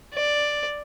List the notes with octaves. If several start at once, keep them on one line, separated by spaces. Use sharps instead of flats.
D5